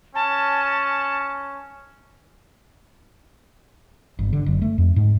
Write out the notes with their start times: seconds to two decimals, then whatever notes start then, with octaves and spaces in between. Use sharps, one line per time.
0.15 C#4 A5
4.19 G1
4.33 D3
4.46 F#1
4.62 A3
4.78 F2
4.96 G#2